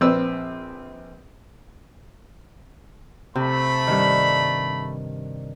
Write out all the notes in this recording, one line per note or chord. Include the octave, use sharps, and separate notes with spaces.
A#1 C4 B4 E6
C3 A3 B5
G2 D#3